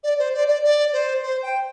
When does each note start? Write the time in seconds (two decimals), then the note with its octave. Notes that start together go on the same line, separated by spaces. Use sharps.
0.03 D5
0.19 C5
0.34 D5
0.48 D5
0.64 D5
0.93 C5
1.23 C5
1.43 G5